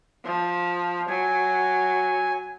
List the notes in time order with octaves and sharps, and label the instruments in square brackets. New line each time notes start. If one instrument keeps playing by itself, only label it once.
[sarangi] F3
[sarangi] F#3 [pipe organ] G#5